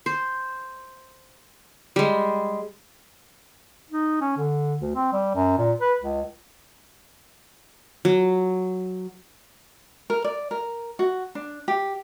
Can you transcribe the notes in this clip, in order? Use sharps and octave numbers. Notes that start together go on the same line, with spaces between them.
C5
G3 G#3
D#4
C#4
D3
D2
C4
G3
F#2
A#2
B4
C#2
F#3
A#4
D5
A#4
F#4
D4
G4